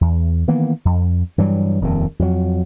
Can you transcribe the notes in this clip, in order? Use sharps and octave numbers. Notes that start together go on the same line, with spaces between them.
E2
D#3 E3 A#3 B3
F2
G2 E3 F#3 G3
D#1 F2 A#2 D#3
F2 F#3